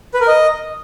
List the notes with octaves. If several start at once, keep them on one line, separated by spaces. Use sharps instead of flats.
B4
A#4
D#5